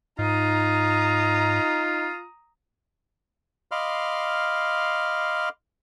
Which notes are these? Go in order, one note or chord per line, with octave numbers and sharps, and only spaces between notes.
G#2 D#4 F4 A#5 D#6
D#5 F5 B5 C6 D6 F6